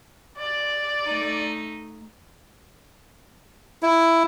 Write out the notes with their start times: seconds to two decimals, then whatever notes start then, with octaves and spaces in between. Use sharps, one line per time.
0.38 D5
1.03 A3 D#4
3.83 E4